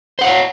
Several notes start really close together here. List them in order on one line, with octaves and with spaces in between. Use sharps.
C5 F#5 F5 C#5